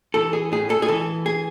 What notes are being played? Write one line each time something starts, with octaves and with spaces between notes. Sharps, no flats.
E3 A4
G#4
A2 G#4
A4
G#4
E3 A4
G#4